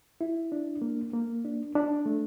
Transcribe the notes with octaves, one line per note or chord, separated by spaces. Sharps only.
E4
D4
A#3
A#3
D4
D4
A3